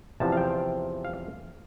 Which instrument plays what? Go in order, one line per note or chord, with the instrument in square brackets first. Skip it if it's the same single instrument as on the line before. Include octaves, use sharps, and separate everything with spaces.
[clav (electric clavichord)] E2 C3 F3 A5
F5
G5
F5